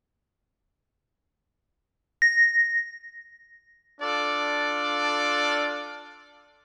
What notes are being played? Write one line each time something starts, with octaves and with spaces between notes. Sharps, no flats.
A#6
D4 F4 A4 D5